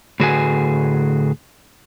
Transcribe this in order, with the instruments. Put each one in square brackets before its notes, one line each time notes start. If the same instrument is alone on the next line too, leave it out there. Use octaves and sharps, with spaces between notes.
[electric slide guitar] A2 D3 F#4 G#4 B4 G#5